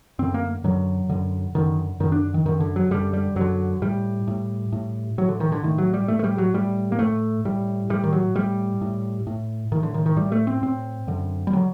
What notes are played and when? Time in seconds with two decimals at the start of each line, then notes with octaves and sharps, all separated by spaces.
0.19 F#2 D3 C4
0.34 A#3
0.64 F#2 D3 F#3
1.09 F#2 D3
1.55 F#2 D3 D#3
2.00 F#2 D3 D#3
2.12 D4
2.34 D#3
2.45 F#2 D3 D#3
2.60 D3
2.76 F#3
2.91 F#2 D3 G3
3.13 G3
3.36 F#2 D3 F#3
3.82 A2 G3
4.28 A2
4.72 A2
5.18 A2 F#3
5.29 D3
5.40 D#3
5.52 D3
5.63 A2 D#3
5.78 F#3
5.94 G3
6.08 A2 A3
6.19 A3
6.24 G3
6.38 F#3
6.54 A2 G3
6.92 A#3
6.99 A2 A3
7.45 A2 G3
7.90 A2 G3
8.04 D#3
8.13 F#3
8.35 A2 G3
8.81 A2
9.27 A2
9.72 A2 D#3
9.83 D3
9.94 D#3
10.06 D#3
10.17 A2 G3
10.32 A3
10.47 C4
10.62 A2 C4
11.07 F#2 D3
11.47 G3
11.53 D3 F#3